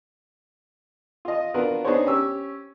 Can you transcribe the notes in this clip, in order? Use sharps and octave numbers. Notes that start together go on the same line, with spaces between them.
F4 D#5
B3 D4 F4 F#4 A#4 B4
B3 D4 D#4 G#4 C5 C#5
C#4 G4 C#6 E6